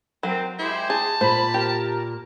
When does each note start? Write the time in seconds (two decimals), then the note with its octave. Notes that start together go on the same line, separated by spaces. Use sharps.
0.23 F#3 C4 A#4
0.59 G#3 E4 G4 C5
0.90 G#4 A5
1.21 A#2 C5 B5
1.54 G4 A#4